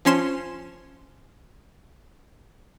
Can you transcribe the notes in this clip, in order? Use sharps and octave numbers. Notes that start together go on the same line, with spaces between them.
F3 C#4 C6 E7